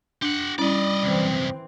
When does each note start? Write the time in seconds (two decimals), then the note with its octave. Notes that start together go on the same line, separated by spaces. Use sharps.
0.22 D4 G4 F#5
0.59 G3 C#4 E4 D5 D#5
1.03 C2 F#2 E3 C4